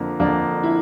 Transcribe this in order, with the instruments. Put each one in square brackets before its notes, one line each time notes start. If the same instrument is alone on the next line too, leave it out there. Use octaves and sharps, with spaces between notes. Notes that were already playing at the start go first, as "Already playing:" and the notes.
Already playing: [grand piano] F2 D3 F3 A#3
[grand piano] F2 D3 F3 A#3 [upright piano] D4
[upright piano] E4